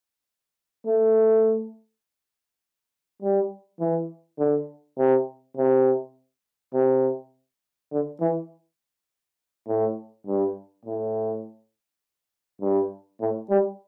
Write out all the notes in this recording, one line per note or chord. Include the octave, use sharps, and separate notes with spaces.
A3
G3
E3
D3
C3
C3
C3
D3
E3
A2
G2
A2
G2
A2
G3